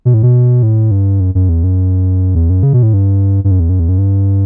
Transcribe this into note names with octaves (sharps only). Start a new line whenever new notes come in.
B2
A2
B2
A2
G2
F#2
F#2
E2
F#2
E2
F#2
C#3
B2
A2
G2
G2
F#2
E2
F#2
E2
F#2
G2